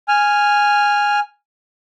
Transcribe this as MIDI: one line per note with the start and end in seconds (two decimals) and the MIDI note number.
0.08 1.20 80
0.08 1.20 89